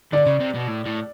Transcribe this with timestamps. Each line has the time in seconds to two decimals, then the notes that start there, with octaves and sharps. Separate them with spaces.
0.12 D3 D5
0.26 C#3
0.40 C3
0.55 B2
0.68 A2
0.86 A2